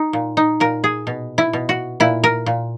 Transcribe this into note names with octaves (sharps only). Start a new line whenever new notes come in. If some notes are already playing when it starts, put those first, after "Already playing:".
Already playing: D#4
A#2
D#4
A#2 A#4
G#4
B2
E4
B2
F#4
A#2 E4
A#4
A#2